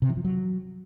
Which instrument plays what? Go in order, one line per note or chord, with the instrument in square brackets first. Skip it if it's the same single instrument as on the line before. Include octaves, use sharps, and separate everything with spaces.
[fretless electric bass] C3
E3
F3
F#3